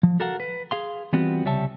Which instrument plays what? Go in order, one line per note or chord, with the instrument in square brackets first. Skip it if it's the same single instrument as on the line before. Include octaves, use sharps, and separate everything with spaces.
[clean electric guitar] F3
F#4 A4 A#4 F5 F#5
B4
G#4 F5 C6
E3 G3 B3 C4 F4 F#4
C2 C#3 G3 C#5 E5 A5